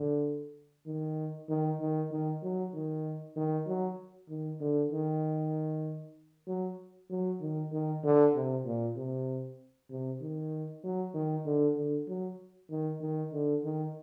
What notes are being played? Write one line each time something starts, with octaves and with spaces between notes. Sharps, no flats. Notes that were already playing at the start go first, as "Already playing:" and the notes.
Already playing: D3
D#3
D#3
D#3
D#3
F#3
D#3
D#3
F#3
D#3
D3
D#3
F#3
F#3
D#3
D#3
D3
C3
A#2
C3
C3
D#3
F#3
D#3
D3
D3
F#3
D#3
D#3
D3
D#3